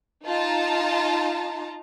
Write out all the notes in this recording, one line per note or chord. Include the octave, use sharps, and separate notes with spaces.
D#4 F4 A5 A#5